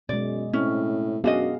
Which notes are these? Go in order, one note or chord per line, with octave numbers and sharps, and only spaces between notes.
F#2 B2 G#3 D5
A2 C4 C#4
F#2 B3 D4 F#4 G#4 D#5 F5